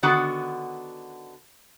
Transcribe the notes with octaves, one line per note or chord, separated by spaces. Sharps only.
D3 D#3 B3 F#4